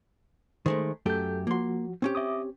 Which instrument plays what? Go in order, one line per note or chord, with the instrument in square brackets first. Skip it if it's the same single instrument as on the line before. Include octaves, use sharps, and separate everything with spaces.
[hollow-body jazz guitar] D#3 G#3 A3 [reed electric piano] C5
[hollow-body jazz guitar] F#2 A3 G4 [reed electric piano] A4 G6
[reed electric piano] F3 F#4 [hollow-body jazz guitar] A#3 C6
[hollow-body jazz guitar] C4 C#4 G4
[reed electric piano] E5 D6 D#6